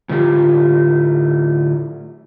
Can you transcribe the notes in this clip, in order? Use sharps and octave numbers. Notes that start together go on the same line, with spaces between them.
A2 D3 A3 F4 G4